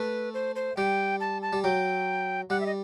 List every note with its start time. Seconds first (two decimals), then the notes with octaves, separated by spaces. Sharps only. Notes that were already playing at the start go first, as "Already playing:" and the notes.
Already playing: A3 B4
0.34 C5
0.56 C5
0.77 G3 G5
1.20 A5
1.42 A5
1.53 G3
1.63 F#3 G5
2.50 G3 F#5
2.61 E5
2.66 D#5